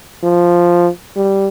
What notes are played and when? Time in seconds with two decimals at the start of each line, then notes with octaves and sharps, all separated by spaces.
0.23 F3
1.16 G3